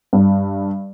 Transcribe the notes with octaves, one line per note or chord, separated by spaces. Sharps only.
G2